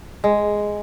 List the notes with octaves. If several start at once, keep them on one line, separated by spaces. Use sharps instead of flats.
G#3